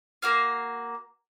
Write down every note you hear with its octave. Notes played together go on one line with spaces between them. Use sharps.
A#3 F#4 F5